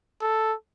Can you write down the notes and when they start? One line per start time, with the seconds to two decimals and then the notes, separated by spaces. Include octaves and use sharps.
0.22 A4